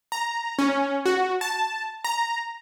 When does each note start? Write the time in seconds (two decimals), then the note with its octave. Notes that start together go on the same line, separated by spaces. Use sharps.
0.12 A#5
0.59 C#4
1.06 F#4
1.41 A5
2.04 A#5